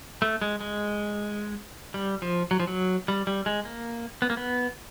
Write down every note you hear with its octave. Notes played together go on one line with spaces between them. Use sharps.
A3
G#3
G#3
G3
F3
F#3
F3
F#3
G3
G3
G#3
A#3
B3
A#3
B3